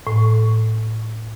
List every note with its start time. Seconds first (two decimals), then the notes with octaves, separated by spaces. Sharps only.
0.07 A2